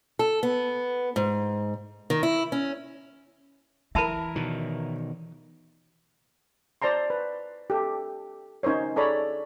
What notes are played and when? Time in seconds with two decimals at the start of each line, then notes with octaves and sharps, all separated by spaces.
0.19 A4
0.43 B3
1.16 G#2
2.10 D#3
2.23 E4
2.52 C#4
3.95 E3 E4 A#4 E5 A5 B5
4.36 B2 D#3
6.82 C5 D5 A5 A#5 C6
7.10 B4
7.70 G4 A4
8.63 C#4 D#4 A#4 C5 C#5
8.96 G#4 A4 C#5 D5 A#5 B5